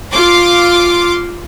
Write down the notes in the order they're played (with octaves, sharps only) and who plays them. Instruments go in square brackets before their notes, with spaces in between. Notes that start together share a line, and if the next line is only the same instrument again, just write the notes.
[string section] F4 C6 D6